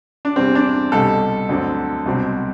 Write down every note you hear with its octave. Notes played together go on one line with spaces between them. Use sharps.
D4
E2 C3 G3 C4
D4
C2 B2 G3 A4
D2 D3 F#3 C4
C2 B2 F#3 C4